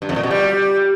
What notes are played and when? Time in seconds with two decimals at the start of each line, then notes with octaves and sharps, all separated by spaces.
0.02 G2
0.09 F2
0.16 A#2
0.23 B2
0.31 G3